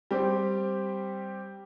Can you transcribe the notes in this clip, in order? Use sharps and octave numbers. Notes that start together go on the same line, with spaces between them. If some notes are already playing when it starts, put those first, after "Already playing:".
G3 C4 G4